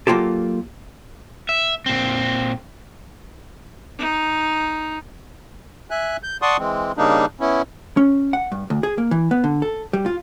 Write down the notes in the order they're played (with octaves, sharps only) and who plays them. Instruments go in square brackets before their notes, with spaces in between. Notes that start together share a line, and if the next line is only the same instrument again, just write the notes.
[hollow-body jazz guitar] F#3 G3 A#3 F4 G4 A4
[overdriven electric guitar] E5
A#2 C4
[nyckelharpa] D#4
[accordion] E5 G#5 F#6
G6
D5 F#5 A5 C6 C#6 D#6
E3 G#3 C4
C#3 G3 A#3 D4 D#4
B3 C#4 E4
[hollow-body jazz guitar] C#4
F#5
G2
D2
G#4
A#3
E3
B3
D3
A4
G3
F4